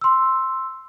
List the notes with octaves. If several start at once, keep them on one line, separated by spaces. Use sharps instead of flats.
C6 E6